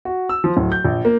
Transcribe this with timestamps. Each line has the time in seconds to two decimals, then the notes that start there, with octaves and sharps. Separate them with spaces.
0.05 F#4
0.29 E6
0.44 F3
0.57 D1
0.72 G6
0.85 A#1
1.05 A#3